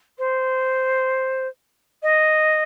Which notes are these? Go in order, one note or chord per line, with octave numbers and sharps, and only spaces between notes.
C5
D#5